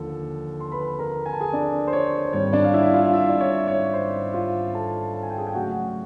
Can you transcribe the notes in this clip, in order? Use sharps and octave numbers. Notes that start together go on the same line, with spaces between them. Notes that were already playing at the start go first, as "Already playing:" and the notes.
Already playing: D#2 D3 F3 A4
C6
B4 B5
A#4 A#5
G#5
A5
G#4 G#5
D4 D5
C5
C#5
G#1 G#2 D#3 G3 C#5
D4 D5
F5
E4 E5
F4 F5
F5
E4 E5
D5
C#5
C#5
C5
F4 F5
A4 A5
A5
G#5
G5
G#4 G#5
G5
C#3 F#3 A3 C#4 F#4 F#5